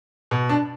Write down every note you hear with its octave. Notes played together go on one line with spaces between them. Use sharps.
B2
D4